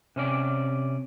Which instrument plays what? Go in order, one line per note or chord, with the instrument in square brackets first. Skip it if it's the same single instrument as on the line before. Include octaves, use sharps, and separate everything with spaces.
[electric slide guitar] C3 C#4 D5